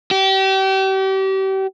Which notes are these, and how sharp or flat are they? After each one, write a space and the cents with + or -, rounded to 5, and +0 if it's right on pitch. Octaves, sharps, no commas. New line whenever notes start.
G4 -35